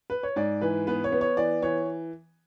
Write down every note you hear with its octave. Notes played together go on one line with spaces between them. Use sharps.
B4
C#5
G#2 D5
E3 B4
B3 B4
C#5
B3
C#5
E3 D5
E3 C#5